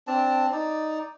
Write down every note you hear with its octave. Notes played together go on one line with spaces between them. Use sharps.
C4 D4 A5
D#4 D5